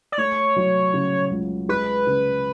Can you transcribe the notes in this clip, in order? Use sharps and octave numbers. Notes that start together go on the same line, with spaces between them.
D5
A3 C#5
F#3
C#3
C#2
G#3 B4
C#3